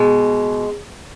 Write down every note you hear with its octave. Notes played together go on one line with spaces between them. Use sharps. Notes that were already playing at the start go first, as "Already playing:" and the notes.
Already playing: B2 G#3